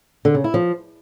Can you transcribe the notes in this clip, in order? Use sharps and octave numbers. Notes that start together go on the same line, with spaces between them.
D3
C#3
E4
F3